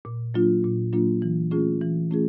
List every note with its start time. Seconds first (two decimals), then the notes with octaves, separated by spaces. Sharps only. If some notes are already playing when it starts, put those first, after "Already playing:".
0.05 A#2
0.34 F#3 A#3 D4 F4
0.64 A#2
0.93 F#3 A#3 D4 F4
1.22 E3
1.51 A3 C#4 F4 G#4
1.81 E3
2.11 A3 C#4 F4 G#4